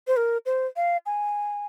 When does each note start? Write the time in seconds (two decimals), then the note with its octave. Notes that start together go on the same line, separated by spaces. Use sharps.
0.08 C5
0.17 A#4
0.46 C5
0.76 F5
1.06 G#5